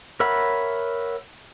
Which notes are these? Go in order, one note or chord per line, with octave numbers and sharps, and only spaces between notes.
A#4 C#5 E5 F#5 B5